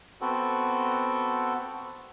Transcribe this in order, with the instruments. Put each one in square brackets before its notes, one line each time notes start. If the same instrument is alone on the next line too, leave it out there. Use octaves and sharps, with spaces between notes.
[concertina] B3 C4 F#4 A4